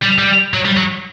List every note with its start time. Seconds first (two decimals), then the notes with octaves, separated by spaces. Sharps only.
0.02 G3
0.19 G3
0.54 F#3
0.65 G3
0.77 F#3